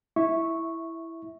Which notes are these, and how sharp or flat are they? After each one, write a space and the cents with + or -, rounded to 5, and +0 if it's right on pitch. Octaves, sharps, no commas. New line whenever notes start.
E4 +0 E5 -15 C#6 -5